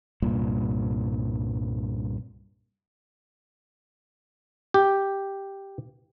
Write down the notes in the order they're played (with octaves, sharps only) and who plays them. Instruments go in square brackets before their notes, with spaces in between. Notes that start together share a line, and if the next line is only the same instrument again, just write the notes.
[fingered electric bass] C2 G2 A#2
[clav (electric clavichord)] G4